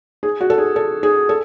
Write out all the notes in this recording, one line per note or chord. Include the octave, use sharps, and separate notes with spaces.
G#4
F#4
A4
G#4
A4
G#4
A4